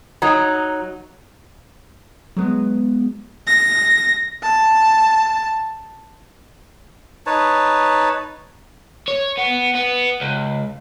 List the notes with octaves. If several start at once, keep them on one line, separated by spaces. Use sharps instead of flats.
F#3 D#4
F#3 G#3 B3
A#6
A5
D#4 B4 C#5 A5
C#5
B3
B3
C#2